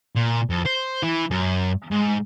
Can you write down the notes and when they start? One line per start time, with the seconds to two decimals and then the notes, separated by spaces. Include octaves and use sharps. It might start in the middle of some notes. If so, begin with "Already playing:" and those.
0.16 A#2
0.50 F2
0.66 C5
1.02 E3
1.31 F#2
1.91 G#2